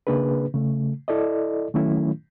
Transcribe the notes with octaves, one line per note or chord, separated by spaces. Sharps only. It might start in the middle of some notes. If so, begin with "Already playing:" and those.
C#3 A#3 D4 G#4 B4
C#3 A3
E4 A4 D5 D#5
D#3 F#3 A3 C#4 E4